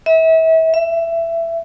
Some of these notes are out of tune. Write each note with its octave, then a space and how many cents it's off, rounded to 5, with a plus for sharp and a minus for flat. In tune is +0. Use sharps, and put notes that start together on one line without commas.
E5 -35
E5 +20